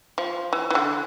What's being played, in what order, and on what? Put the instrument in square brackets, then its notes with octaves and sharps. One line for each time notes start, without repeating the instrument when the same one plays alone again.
[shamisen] F3
E3
E3
D3